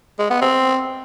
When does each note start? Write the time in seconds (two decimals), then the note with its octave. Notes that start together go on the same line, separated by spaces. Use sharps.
0.19 G#3
0.30 B3
0.41 C4